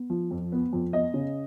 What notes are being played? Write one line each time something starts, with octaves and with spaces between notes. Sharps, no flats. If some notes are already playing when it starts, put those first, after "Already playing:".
Already playing: B3
F3
F2
B3
F2
B3 D#5
C#3